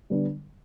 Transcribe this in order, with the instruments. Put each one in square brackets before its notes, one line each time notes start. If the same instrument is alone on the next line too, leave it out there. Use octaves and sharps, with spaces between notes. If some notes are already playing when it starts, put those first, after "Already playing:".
[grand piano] D3 G3 B3 D4